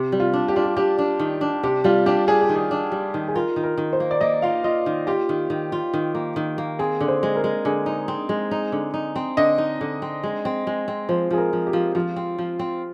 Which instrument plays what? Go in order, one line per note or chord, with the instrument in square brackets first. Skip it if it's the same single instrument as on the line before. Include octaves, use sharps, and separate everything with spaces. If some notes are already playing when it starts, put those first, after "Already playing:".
Already playing: [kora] C3 [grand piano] G4
[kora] G3
[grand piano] F4
[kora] D4
[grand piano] G4
[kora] D4 [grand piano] F4
[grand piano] G4
[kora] D4 [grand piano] G4
[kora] D4
D#3
D4
[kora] C3 [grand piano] G4
[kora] G3 [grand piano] F4
[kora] D4 [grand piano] G4
[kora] D4 [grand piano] G#4
[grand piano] G4
[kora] D#3
[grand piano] G#4
[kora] D4
G3
D#3
[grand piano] G#4
[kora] F4 [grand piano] A#4
[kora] D#3
[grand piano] A#4
[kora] D#3
[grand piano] C5
[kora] A#3
[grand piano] D5
[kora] A#3 [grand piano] D#5
[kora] F4 [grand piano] F5
[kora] F4 [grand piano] D#5
[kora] D#3
[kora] F4 [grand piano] G4
[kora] D#3
D#3
F4
D#3
A#3
D#3
A#3
[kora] C4 [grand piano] G#4
[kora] D3
[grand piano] C5
[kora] G#3
[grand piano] A#4
[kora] G#3
[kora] D3 [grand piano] G#4
[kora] D#4
C4
G#3
D#4
D3
D#4
C4
[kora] D3 [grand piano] D#5
[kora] D#4
D3
C4
G#3
C4
G#3
C4
[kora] F3 [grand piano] C5
[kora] F3 [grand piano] G#4
[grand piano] A#4
[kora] F3
[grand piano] G4
[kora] F3
[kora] F3 [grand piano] F4
[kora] C4
F3
C4